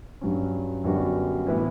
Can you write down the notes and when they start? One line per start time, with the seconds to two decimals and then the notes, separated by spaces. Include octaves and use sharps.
0.21 G2 F#3 C#4
0.84 F#2 D3 G3 B3 F#4
1.47 A2 E3 B3 E4